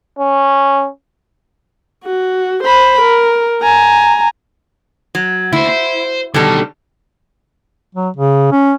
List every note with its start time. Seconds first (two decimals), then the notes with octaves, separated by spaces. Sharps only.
0.19 C#4
2.04 F#4
2.63 C5 B5
3.01 A#4
3.62 G#5 A#5
5.15 F#3
5.53 D2 E4 C5
5.69 C5
6.34 B2 D3 D#3 G3 A4
7.95 F#3
8.16 C#3
8.52 C#4